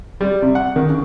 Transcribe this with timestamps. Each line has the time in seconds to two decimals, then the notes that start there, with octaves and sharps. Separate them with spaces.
0.21 G3
0.42 C3
0.55 F#5
0.76 D#3
0.90 C#3